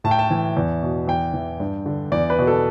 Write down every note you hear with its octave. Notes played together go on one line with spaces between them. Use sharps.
A2 A5
G5
A5
E3
E2
B2
E2 G5
E3
G2
D3
E2 D5
B4
B2
A4